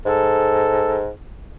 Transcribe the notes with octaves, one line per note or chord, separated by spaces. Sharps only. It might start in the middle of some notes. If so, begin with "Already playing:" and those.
G#2 A4